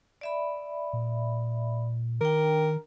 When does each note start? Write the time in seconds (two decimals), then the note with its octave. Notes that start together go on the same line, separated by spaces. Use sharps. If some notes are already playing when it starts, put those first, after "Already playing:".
0.21 D5 E5 B5
0.93 A#2
2.21 D#3 D4 A#4 G5